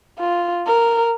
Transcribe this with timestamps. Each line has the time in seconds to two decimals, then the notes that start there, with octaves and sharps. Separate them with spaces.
0.19 F4
0.67 A#4